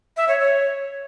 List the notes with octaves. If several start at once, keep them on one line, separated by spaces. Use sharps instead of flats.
E5
C#5
C#5